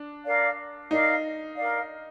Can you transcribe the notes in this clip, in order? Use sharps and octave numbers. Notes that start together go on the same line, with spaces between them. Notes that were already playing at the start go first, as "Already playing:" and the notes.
Already playing: D4
A#4 D5 F5
D#4 A#4 D5 F5
A#4 D5 F5